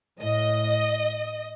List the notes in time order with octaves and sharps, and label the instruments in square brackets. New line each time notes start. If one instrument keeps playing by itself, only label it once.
[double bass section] A2 [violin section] D#5